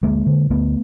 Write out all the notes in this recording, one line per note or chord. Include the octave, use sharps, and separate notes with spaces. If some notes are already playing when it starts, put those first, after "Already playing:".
D2 G#3 A#3
D3
D2 A3 B3